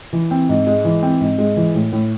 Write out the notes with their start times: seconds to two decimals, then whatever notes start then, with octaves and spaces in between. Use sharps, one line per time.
0.13 E3
0.31 C4
0.49 G#2
0.67 G#3
0.85 E3
1.03 C4
1.21 G#2
1.39 G#3
1.57 E3
1.75 A2
1.93 A2